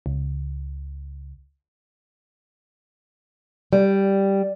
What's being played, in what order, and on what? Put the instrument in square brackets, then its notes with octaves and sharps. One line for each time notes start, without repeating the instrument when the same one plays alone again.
[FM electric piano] C#2
[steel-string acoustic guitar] G3